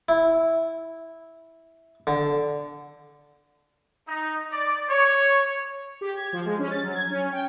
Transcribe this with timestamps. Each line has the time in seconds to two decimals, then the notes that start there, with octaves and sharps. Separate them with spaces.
0.09 E4
2.07 D3
4.08 D#4
4.52 D5
4.89 C#5
6.01 G4
6.15 G#6
6.33 F3
6.45 G#3
6.59 C#4
6.71 A6
6.83 F#3
6.95 G#6
7.10 C#4
7.33 G5